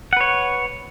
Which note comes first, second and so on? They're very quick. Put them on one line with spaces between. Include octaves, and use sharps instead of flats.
F#5 B4 C#5